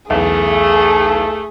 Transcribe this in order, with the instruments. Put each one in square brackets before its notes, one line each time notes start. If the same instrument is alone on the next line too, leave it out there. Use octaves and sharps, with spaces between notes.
[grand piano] B1 E2 [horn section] A3 [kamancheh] G#4